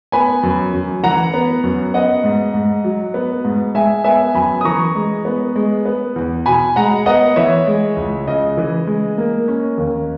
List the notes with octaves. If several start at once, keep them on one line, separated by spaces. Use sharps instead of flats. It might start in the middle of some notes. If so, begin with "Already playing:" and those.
B3 G#5 B5
F#2
F#2
E3 F#5 A#5
B3
F#2
B3 D#5 F#5
G#2
G#2
F#3
B3
G#2
G#3 E5 G#5
B3 E5 G#5
F#2 G#5 B5
D#6
E3 A#5 C#6
G#3
B3
G#3
B3
E2
B2 G#5 B5
G#3 F#5 A#5
B3 D#5 F#5
E3 C#5 E5
G#3
C#2
C#3 D#5
E3
G#3
A#3
C#4
D#2